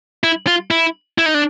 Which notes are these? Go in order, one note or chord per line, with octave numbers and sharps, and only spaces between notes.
E4
F4
E4
E4
D#4
D4